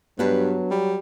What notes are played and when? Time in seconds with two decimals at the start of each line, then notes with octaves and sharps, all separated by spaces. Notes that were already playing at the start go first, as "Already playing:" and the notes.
0.19 G2 F#3 B3 D4 B4
0.71 G3